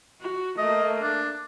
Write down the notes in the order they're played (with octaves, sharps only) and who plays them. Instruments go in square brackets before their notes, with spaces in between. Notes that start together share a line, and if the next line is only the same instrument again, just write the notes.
[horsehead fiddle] F#4
[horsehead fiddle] A3 A#3 [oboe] D#5
[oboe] D4